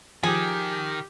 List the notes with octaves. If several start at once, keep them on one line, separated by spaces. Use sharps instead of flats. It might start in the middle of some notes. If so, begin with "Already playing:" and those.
D#3 F3 G4 G#4